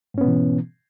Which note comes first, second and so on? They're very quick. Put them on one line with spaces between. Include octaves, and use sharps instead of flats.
G#2 C#4 B3 B2 E3